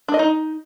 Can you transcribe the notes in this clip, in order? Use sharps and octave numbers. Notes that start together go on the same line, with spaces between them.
D4
D#5
D#4